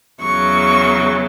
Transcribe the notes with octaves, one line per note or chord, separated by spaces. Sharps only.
E2 C#3 F#3 C#6